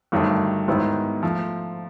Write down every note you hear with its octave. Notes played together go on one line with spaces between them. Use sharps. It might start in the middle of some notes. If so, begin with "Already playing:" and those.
G1 G2 D#3 F#3 A3
G#2 D#3 F#3 B3 E4
F3 A3